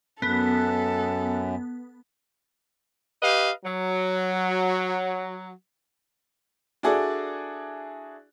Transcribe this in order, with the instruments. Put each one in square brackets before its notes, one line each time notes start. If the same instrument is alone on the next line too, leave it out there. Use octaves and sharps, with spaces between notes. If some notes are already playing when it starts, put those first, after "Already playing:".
[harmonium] F#2 [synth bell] B3 [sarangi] A4
[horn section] G4 B4 D#5 F5
F#3
[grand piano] D4 E4 F#4 G#4 A4 D5